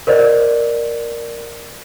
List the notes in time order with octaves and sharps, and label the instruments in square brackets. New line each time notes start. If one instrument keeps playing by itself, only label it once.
[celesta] A#4 C5 D5 D#5